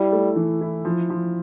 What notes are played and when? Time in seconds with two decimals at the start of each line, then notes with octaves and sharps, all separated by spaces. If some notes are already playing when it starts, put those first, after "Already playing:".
Already playing: G3 E4
0.12 A3
0.36 E3
0.61 E4
0.85 F3
1.10 F3